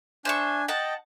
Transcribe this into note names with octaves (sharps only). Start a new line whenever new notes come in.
D4 C5 E5 G#5 C#6
D#5 F#5 G5 A5